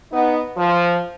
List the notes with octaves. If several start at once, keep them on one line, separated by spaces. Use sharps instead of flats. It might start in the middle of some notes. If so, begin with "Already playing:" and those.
B3 D#4
F3